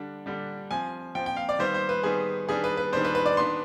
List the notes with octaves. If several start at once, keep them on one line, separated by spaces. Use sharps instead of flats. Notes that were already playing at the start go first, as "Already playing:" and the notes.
Already playing: D3 G3 D4
D3 G3 D4
F3 C4 G#5
F3 C4 G5
G5
F5
D5
D#3 G3 B3 C5
C5
B4
D#3 G3 B3 G#4
D#3 G3 B3 D4 G#4
B4
B4
D#3 G3 B3 D4 C5
B4
B4
D5
D#3 B3 D4 C6